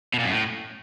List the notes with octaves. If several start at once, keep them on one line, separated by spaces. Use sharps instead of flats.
B2
A#2
F#2
A2